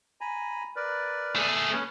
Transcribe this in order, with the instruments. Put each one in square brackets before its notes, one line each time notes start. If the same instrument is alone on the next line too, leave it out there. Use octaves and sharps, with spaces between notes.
[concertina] G#5 A#5 B5
A#4 B4 D5
[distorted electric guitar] A3 G#4
[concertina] C#4 B4 C#5